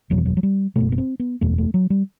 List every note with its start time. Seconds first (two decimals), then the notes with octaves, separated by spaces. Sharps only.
0.10 F#1 E2 B2 F#3
0.18 E3
0.26 F#3
0.37 F#3
0.43 G3
0.76 F#1 E2 B2 A3
0.92 B3
0.98 C4
1.20 B3
1.41 F#1 E2 B2 A3
1.58 A3
1.74 F#3
1.90 G3